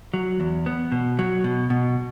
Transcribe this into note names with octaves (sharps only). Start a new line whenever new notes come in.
F#3
E2
B3
B2
F#3
B2
B2